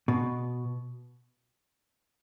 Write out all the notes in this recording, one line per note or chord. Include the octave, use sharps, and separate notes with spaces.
B2